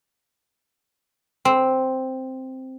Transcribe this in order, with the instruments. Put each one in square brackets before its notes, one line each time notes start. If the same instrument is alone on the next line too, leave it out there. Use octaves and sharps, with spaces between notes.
[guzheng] C4